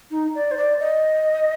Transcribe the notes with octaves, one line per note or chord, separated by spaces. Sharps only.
D#4
D5
C5
D5
D#5